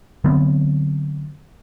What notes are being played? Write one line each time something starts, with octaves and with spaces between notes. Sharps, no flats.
D3 F#3 B3 C4